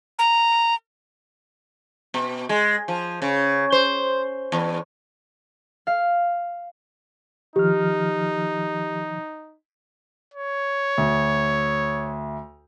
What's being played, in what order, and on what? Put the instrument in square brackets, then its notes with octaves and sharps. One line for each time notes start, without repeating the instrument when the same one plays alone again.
[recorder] A#5
[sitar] B2
G#3
F3
C#3
C5
E2
[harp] F5
[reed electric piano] D#3 F3 F6 [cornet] D#4 [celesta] G4
[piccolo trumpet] C#5
[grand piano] D2